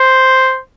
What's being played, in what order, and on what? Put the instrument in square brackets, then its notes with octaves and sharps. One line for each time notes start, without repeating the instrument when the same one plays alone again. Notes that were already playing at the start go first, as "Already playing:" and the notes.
Already playing: [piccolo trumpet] C5